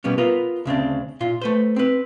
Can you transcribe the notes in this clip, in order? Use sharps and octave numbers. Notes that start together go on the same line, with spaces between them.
B2 G3 A#3 B3 C#4
B3 F4 A#4 B4
D2 C#3 C4 D4
A#2 F4
A3 B4 C5
C4 B4